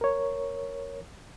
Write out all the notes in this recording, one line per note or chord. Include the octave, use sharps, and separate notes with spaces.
A#4 C#5